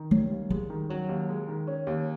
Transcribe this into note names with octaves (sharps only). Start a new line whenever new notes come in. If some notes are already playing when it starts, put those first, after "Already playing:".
Already playing: D#3
G3 C#4
D#2
G3 G#3
D#3
F#3 C#4
D#2
G#3
D#3
C#4
D#2